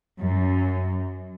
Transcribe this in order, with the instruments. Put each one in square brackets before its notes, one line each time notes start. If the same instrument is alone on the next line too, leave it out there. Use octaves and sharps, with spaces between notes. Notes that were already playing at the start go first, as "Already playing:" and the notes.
[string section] F#2